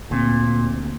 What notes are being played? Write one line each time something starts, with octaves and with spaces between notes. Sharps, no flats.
D2 A#2 C4